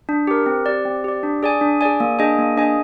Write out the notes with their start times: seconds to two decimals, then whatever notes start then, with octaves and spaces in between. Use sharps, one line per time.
0.09 D4
0.27 G4 A#4
0.46 C4
0.66 G4 D5
0.85 C4
1.04 G4 D5
1.23 D4
1.43 G#4 D5 G#5
1.61 D4
1.81 G#4 D5 G#5
2.00 A#3
2.19 D4 G#4 D#5 G#5
2.39 A#3
2.57 D4 G#4 D#5 G#5